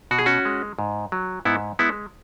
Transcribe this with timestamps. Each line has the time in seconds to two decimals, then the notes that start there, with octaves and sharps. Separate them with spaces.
0.11 B2 F#4
0.19 G#4
0.26 C#4 F#4
0.45 G#3
0.79 G#2
1.12 F#3
1.45 G#2 B3 E4
1.79 G#3 B3 E4